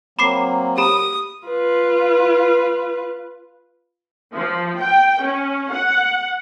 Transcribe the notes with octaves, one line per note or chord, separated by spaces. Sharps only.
F#3 A#3 C4 B5 D6 C7
G4 B5 D#6
F4 B4
F3
G5
C#4
F#5